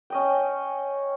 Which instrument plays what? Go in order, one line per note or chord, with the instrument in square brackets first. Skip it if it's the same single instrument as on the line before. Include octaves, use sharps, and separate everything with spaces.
[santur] C#4 D#5 G5